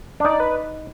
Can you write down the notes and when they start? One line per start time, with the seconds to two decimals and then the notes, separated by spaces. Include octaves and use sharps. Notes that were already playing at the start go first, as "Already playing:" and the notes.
0.20 D4
0.24 D#4 D5
0.40 B4